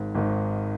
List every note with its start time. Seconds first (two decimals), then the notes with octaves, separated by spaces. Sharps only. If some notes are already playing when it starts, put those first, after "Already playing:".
Already playing: G#1 G#2 D#3
0.15 G#1 G#2 D#3